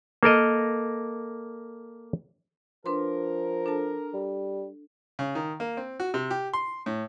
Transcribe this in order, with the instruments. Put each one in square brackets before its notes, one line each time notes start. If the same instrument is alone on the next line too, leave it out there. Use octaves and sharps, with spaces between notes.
[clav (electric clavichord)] A#3 A4 A#4 D#5
[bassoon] F3 [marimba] D4 B4 C6 [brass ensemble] A#4
[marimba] D4 A4 A5
[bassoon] G3
[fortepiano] C#3
D#3
A#3
C4
F#4
C3
G4
C6
A2